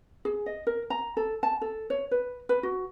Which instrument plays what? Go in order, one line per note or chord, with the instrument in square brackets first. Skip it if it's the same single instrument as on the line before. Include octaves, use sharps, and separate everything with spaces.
[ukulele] G#4
D#5
A#4
A#5
A4
A5
A4
C#5
B4
B4
F#4